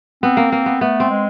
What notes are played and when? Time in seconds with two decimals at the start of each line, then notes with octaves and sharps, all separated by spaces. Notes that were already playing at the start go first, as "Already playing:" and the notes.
0.23 B3 C4
0.37 A#3
0.52 A#3
0.66 B3
0.81 A3 B3
1.00 C4
1.10 G#3